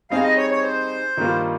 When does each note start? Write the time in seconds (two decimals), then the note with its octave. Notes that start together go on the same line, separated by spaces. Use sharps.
0.10 G3 C4 D#4 G#4 F5
0.23 D#5
0.37 C#5
0.51 C#5
0.63 C5
1.17 G2 D#3 G3 A#3 F4